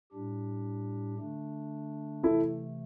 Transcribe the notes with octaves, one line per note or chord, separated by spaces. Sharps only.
A2 G3 D4 G4
D3 A3 D4
C3 E3 A3 E4 A4